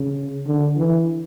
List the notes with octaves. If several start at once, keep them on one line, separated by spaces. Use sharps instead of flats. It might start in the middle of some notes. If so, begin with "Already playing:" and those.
Already playing: C#3
D3
E3